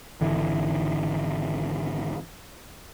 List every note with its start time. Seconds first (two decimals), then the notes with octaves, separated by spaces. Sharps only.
0.21 G#1 D3 E3